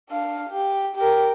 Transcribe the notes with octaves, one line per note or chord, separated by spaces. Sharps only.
D4 F5
G4
G4 A#4